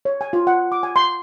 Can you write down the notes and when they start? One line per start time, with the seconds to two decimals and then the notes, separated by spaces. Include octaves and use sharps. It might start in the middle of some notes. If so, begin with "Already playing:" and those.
0.05 C#5
0.21 G#5
0.33 F4
0.47 F#5
0.72 D6
0.83 G#5
0.96 C6